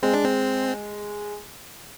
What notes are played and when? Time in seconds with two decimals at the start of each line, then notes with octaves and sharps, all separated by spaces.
0.03 G#3 C4
0.14 D4
0.24 C4